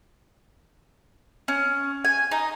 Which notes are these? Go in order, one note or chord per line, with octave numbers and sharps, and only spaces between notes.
C#4
G#5
D#4